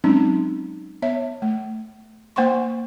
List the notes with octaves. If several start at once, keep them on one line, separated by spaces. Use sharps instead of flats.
F#3 G#3 C4 C#4 D#4
B3 C#5 E5
A3
A#3 C5 F#5 G5 C6 C#6